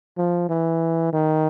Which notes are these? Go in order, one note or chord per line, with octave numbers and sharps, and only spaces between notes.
F3
E3
D#3